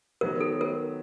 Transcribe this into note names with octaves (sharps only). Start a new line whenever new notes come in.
D#3 F#3 B3 A#4
A4
A#4